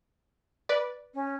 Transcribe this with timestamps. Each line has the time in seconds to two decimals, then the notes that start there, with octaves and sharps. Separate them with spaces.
0.69 B4 D5
1.14 C#4